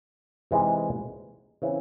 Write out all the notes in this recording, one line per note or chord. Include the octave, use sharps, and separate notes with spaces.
C3 E3 G#3 D#4
C#3 E3 C4 E4